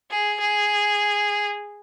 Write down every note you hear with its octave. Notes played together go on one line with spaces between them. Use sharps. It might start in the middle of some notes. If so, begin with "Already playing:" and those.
G#4
G#4